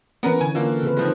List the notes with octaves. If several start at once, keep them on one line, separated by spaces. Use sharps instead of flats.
E3 B3 C#4 A#4 B4
D3 G#5
D3 A#3 F4
C#3 C4 B4
D#3 F3 G#3